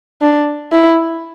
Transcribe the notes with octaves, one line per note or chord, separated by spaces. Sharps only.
D4
E4